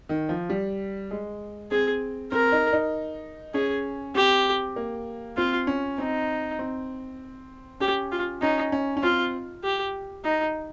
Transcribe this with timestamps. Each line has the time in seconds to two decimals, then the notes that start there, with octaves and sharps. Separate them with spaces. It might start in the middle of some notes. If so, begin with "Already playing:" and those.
0.09 D#3
0.29 F3
0.49 G3
1.11 G#3
1.71 C4 G#4
2.32 C4 A#4
2.52 D#4
2.73 D#4
3.54 C#4 G#4
4.15 C4 G4
4.76 A#3
5.37 C4 F4
5.67 C#4
5.98 C4 D#4
6.59 C4
7.80 C#4 G4
8.11 F4
8.42 C#4 D#4
8.72 C#4
8.97 C#4
9.03 C4 F4
9.64 G4
10.25 D#4